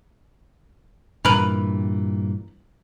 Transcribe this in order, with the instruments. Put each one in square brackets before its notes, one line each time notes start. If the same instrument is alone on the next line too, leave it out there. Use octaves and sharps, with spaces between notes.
[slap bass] G2 A#2 E3 [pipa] A#4 B4